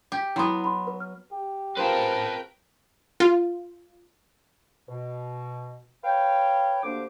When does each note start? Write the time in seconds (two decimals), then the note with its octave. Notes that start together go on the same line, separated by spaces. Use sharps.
0.12 G4
0.36 F#3 B3 E4 B5 C6
0.64 B5 C6
0.87 B4
1.00 F6
1.32 G4
1.77 C4 F4 G#4 A#4 B4 G5 A5
3.20 F4
4.88 B2
6.04 B4 C#5 F5 G5
6.83 D2 A#3 D4 G4 C5 D6